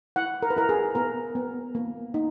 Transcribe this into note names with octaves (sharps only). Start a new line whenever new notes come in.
E4 F#5
A#4
B4
E4 A#4
G#4
B3 A#4
B3
A#3
D#4